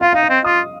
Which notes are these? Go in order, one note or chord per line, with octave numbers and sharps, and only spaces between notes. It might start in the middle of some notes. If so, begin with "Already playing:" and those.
F4 F5
D#4 F5
D#5
C4
F4 D#6